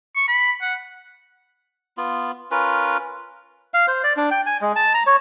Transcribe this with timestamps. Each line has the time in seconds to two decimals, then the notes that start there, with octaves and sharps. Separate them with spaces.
0.16 C#6
0.28 B5
0.61 F#5
1.97 B3 F4
2.51 C#4 F4 A#4 B4
3.74 F5
3.88 C5
4.04 D5
4.17 D4
4.31 G5
4.46 G#5
4.61 G#3
4.76 A5
4.94 A#5
5.07 C#5